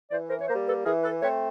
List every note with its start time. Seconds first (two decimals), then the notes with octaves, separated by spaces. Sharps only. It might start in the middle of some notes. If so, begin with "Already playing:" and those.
0.11 E3 C5 D5
0.29 A#4 C5
0.40 C#5
0.48 G3 A#3 A#4 C5
0.67 A4 B4
0.85 E3 G#4 A#4
1.03 A4 B4
1.22 A3 C4 B4 C#5